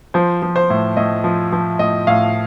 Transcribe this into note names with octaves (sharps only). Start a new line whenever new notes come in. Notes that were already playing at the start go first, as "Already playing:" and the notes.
F3 C5
F3
C5
A2
A2 D#5
F3
F3
A2 D#5
A2 F5